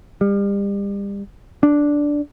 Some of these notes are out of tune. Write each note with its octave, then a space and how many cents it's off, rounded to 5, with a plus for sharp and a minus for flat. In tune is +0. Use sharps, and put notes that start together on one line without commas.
G3 +35
D4 -5